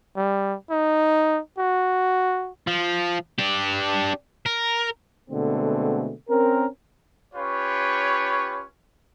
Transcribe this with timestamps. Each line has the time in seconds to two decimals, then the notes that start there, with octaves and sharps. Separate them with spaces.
0.17 G3
0.70 D#4
1.58 F#4
2.67 F3
3.39 D4 G4
4.46 A#4
5.30 B2 D3 G#3 A3 C4
6.30 C4 C#4 A#4
7.34 C#4 F4 G4 B4 C#5